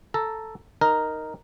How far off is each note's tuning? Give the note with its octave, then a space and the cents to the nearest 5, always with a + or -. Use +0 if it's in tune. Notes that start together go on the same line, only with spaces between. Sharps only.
A4 +0 A#5 +0
D#4 +0 A#4 +0